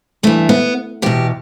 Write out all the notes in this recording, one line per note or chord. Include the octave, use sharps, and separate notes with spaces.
G2 E3 A3
B3
E2 B2 G4